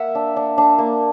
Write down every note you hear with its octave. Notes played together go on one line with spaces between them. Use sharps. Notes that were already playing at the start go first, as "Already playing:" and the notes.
Already playing: A#3 E5 F#5
D4
D4
D4
A#3